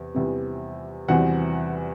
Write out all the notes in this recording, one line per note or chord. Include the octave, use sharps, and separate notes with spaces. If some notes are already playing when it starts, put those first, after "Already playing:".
Already playing: E2 C3
E2 C3 E3 G3 C4
E2 C3 E3 G3 C4 F#4 F#5